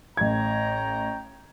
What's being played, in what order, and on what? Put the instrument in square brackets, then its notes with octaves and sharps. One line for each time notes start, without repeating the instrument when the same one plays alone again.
[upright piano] A1 G#6 [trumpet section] C#5 G5 A#5